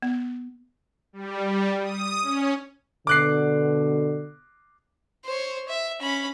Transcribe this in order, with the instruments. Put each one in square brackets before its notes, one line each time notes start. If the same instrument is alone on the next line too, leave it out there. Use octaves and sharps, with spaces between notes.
[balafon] B3
[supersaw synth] G3
G3
D#6
C#4
[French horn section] B2 D3 [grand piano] D6 F#6 C7
[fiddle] C5 C#5
E5
C#4 B5